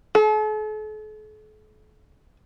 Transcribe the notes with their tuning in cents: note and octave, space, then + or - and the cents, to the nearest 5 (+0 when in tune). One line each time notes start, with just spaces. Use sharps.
A4 -45